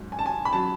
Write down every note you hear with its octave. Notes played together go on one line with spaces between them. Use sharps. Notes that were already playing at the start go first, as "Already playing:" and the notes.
Already playing: G#2 F#3
G#5
A5
G#5
B5
F#3 A5